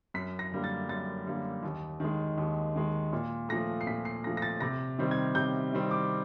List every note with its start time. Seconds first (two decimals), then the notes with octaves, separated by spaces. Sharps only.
0.14 F#2 B6
0.39 A#6
0.52 D3 G3 A#3
0.64 A6
0.89 F#2 A6
1.27 D3 G3 A#3
1.63 D#2
2.00 D#3 G#3
2.38 D#2
2.75 D#3 G#3
3.13 A#2
3.49 F3 A3 A#6
3.81 C7
3.87 A#2 B6
4.05 C7
4.24 F3 A3 A#6
4.37 A#6
4.42 A6
4.61 C3 A#6
4.99 D#3 G3 C4
5.11 G#6
5.35 C3 G6
5.73 D#3 G3 C4
5.91 D6